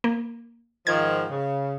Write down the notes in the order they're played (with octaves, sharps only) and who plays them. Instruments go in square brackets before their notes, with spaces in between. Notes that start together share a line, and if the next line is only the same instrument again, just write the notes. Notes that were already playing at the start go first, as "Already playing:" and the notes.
[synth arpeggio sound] A#3
[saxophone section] G#2 D#3 F3 [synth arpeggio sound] G#6
[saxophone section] C#3